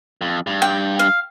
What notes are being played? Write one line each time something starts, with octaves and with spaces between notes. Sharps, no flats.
F2
G2
G5
F5